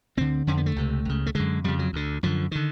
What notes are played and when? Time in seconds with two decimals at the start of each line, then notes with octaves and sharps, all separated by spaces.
0.17 D2 D3 C4
0.47 F2 D3 C#4
0.57 B3
0.66 A3
0.76 C#2 C3
1.05 C#2 C#3
1.26 A3
1.35 F#2 D3 G#3
1.64 F2 C#3 G3
1.79 F#3
1.93 D2 D3
2.23 F#2 D3 F3
2.51 D3 D#3